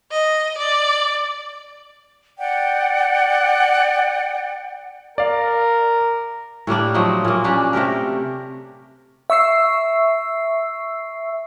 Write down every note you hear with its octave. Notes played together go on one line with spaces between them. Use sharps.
D#5
D5
D5 F#5 G5
A#4 D5 F5
A2 G3 A#3 D4
F3 F#3 A3 D#4
A#2 A#3
G3 C#4 D4 G4
C3 A3 G4 A#4
E5 C#6 E6 C7